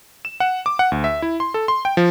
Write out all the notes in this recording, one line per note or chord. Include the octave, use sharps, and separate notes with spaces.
E7
F#5
D6
F#5
D2
E5
E4
C6
A4
C6
G5
F3